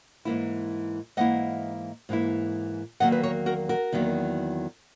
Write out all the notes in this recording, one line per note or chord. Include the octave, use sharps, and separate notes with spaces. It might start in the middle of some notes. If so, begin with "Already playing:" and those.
G#2 E3 A#3 E4
G#2 E3 A#3 E4 D#5 F#5
G#2 E3 A#3 E4
E2 D#3 F#3 A#3 D#5 F#5
B4
A#4 C#5
F#4 A#4
F#4 A#4
E2 D#3 F#3 A#3